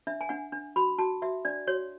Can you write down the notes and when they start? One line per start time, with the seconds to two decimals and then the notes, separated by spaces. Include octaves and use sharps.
0.07 D4 E5
0.21 G#5
0.29 D4 F#5
0.52 D4
0.76 F#4 B5
0.98 F#4 A5
1.22 F#4 E5
1.45 D4 D5
1.67 F#4 C#5